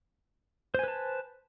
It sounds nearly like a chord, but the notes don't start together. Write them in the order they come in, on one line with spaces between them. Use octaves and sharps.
C5 G#5 B4 A5